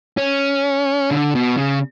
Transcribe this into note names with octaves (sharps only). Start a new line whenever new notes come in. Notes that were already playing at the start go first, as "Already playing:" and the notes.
C#4
D3
B2
C#3